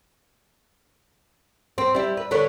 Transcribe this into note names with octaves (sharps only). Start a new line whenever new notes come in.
C4
G3 E4
B4
D3 B4 C#5